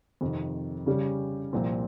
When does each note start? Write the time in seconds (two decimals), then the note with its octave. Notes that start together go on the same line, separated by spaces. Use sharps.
0.21 F2 C3 D#3
0.86 C#3 G3 C#4 G4
1.53 C2 A#2 F3 C4